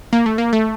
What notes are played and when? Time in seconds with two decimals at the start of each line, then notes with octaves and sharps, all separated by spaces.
0.13 A#3
0.26 A3
0.38 A#3
0.53 A3